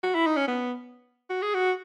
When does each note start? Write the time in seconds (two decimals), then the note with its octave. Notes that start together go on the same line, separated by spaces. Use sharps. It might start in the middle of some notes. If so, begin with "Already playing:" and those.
0.03 F#4
0.15 E4
0.27 D#4
0.37 C#4
0.47 B3
1.30 F#4
1.42 G#4
1.54 F#4